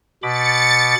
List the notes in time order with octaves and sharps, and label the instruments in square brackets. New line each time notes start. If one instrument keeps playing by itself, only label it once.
[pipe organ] B2 B5 D6 [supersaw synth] A6 C#7